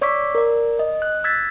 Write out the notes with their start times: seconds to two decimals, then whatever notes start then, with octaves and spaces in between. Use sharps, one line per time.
0.01 C#5 D5 C#6 D6 E6 B6
0.35 A#4 D5
0.79 D#5
1.02 F#6
1.24 E6 G#6 A6 B6